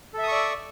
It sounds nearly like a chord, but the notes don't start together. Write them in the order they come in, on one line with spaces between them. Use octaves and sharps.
A4 E5 D#6 C#6 D5